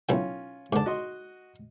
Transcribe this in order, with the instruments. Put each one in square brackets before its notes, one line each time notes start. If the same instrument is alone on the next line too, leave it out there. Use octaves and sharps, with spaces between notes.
[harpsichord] B1 E4 G5 [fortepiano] C#4 F4
[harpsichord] G#2 D3 [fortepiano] A5 D6
[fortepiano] F#4 D#5 C6